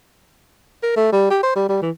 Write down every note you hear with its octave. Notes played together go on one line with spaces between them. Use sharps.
A#4
A3
G3
G4
C5
G3
G3
E3